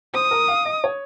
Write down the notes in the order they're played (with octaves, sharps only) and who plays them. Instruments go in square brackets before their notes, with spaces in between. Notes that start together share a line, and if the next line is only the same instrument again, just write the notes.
[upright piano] C5 [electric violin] D#6
[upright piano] A#4
F5
D#5
C#5